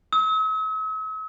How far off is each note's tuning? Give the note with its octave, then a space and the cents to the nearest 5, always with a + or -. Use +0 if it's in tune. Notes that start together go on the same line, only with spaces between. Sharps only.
E6 -45